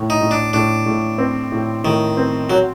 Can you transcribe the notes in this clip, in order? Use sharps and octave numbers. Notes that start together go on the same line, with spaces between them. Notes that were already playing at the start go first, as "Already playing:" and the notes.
Already playing: A2
D#4
A2
D4
A2 D4
A2
C4
A2
A2 D#3
C4
F#3 F#4